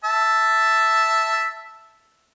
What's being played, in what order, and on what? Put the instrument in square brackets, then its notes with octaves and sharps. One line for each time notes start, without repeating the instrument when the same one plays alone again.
[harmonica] E5 A5